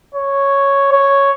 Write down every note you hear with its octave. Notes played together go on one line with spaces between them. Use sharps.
C#5
C#5